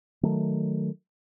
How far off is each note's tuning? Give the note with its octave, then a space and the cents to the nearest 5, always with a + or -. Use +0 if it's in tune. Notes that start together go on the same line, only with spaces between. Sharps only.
D#3 +0 F#3 +0 A3 +0